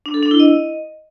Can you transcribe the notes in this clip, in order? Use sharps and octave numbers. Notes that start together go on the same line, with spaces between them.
D4
A4
D4
E4
D#5